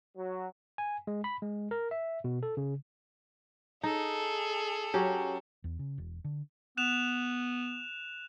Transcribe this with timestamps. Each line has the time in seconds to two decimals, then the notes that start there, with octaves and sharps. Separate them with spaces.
0.17 F#3
0.78 G#5
1.07 G#3
1.24 B5
1.42 G#3
1.71 A#4
1.91 E5
2.24 B2
2.43 A4
2.57 C#3
3.83 D#4 G#4 A4
4.94 F#3 C#4 G4
5.64 E2
5.79 C#3
5.98 E1
6.25 D3
6.77 B3 F#6 E7 F7